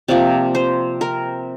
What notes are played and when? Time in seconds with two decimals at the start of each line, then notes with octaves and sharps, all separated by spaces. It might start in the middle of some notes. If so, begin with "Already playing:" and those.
0.08 C3 F3 A#3 D5
0.55 C5
1.01 A#4